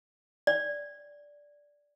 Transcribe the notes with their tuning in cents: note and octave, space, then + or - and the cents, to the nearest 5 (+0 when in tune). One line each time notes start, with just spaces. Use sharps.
D5 -5